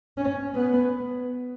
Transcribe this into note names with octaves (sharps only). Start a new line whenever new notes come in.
C#4
B3